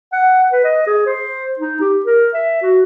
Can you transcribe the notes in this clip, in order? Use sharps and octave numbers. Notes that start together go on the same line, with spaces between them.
F#5
B4
D#5
G#4
C5
D#4
G4
A#4
E5
F#4